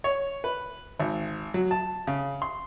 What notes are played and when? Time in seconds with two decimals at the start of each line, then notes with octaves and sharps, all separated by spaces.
0.04 C#5
0.44 B4
0.99 G#1
1.54 F#3
1.71 A5
2.07 C#3
2.42 C6